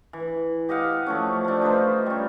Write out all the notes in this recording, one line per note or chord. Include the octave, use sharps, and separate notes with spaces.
E3
G4 D#5 F5 F#5
F3 A3 C#4
A3 D4
D#4 F4 B4 C5
G3 C#4